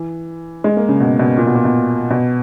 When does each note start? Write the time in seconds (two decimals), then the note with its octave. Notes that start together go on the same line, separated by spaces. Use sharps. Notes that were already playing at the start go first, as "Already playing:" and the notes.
Already playing: E3
0.64 G#3
0.77 A#3
0.89 C#3
1.00 B2
1.19 B2
1.37 A#2
1.47 B2
1.55 A#2
1.65 B2
2.10 B2